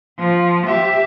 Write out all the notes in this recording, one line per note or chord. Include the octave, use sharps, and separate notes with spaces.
F3
G4 E5